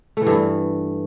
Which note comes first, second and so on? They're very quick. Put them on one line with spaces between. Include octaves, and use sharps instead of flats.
A3 E3 G2